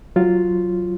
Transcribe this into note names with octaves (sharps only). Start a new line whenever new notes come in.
F#3 F4